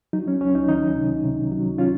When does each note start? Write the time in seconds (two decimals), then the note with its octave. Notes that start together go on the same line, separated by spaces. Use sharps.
0.13 F#3 D#4
0.28 C#4
0.41 C#2 C#4
0.55 D#4
0.68 D#3 D#4
0.96 C3
1.24 C3
1.51 F#3
1.78 C#4 F4